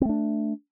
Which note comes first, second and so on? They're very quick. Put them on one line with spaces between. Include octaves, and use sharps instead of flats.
C4 A3 D4